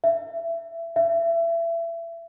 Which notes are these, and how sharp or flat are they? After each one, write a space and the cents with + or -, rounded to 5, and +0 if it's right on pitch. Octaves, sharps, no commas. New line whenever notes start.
E5 +20
E5 +25